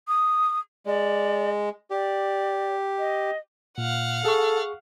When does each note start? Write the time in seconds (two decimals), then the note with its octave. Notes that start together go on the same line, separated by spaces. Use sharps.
0.08 D#6
0.86 G#3 D5
1.91 G4 D5
2.99 D#5
3.78 A#2 F5 F#5
4.25 G#4 A4 C#6